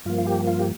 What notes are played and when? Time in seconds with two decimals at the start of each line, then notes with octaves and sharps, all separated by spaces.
0.05 G2 F3 A#3 F4
0.18 F4
0.27 G4
0.47 F4
0.59 G4